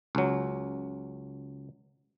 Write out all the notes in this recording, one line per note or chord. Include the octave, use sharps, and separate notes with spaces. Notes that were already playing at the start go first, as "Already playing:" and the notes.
C#2 F#3